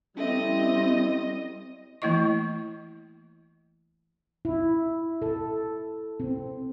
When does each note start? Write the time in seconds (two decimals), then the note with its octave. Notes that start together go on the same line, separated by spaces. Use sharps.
0.17 G3 C4 C#4 E4 A4 D#5 E5
2.02 E3 A3 A#3 E4 D#5 C#6
4.45 E4
5.22 A4
6.20 C4